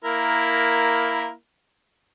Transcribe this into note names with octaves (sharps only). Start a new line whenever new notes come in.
A#3 E4 A#4